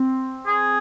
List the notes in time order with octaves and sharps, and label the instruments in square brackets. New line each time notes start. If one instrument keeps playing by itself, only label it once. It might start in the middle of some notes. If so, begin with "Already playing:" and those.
Already playing: [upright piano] C4
[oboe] G#4